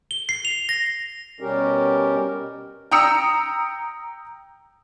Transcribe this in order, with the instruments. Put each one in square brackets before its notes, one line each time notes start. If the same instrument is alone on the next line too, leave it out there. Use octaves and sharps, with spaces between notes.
[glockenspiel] G7
C7
F7
A#6
[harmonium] B2 G3 C#4 G4 A#4
[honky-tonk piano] G5 A#5 D#6 E6 C#7